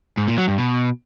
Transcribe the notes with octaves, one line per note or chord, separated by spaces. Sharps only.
G#2
A#2
F#3
G2
B2